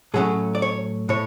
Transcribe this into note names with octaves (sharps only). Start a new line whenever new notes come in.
A2 F#3 A3 C#4 G#4
D5
C#5
A2 C#5